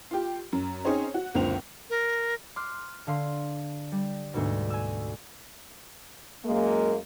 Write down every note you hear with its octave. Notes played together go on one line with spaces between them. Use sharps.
F4 G4
F#2
C4 C#4 D#4 G#4 C5 C#5
F#4
F#1 C#2 A#2 D3 C4 F7
A#4
C6 D6 F6 F#6
D3 F5 C6
G3
D2 G#2 B2
G#5 E6
F#2 G#3 A#3